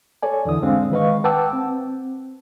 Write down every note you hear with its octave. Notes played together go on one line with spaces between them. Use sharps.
A4 C#5 D5 G#5
E2 D3 E3 D#6
G#2 D3 G#3 C4 D4 F5
D#3 G#3 B4 D#5 F5 C#6
B4 F#5 G5 A5 D6 E6
C4